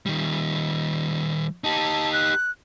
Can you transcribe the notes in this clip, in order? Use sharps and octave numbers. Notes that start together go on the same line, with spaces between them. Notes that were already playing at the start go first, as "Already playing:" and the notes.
D#3 G3
D#4 G4 A5
F#6